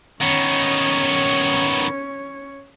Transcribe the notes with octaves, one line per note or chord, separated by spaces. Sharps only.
D#3 B3 C#4 C#5